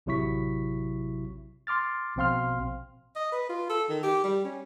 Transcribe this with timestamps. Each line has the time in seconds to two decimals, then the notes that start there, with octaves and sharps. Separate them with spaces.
0.06 A1 C3 F#3 E4 C#6 B6
1.67 C6 D6 F6 A6
2.16 A#1 B2 C4 F5 C6 F6
3.16 D#5
3.32 B4
3.49 F4
3.69 A4
3.90 D#3
4.03 G4
4.24 G3
4.44 C#4